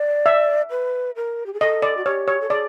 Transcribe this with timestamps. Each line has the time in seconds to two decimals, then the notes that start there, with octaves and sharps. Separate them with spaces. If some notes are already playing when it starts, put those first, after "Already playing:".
Already playing: D5
0.26 E5
0.70 B4
1.16 A#4
1.46 G4
1.54 G#4
1.60 A4 D#5
1.82 D5
1.97 F#4
2.06 G4 C#5
2.28 C#5
2.41 A4
2.50 G#4 D5